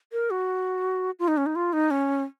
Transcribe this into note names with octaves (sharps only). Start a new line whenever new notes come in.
A#4
F#4
F4
D#4
C#4
D#4
F4
D#4
C#4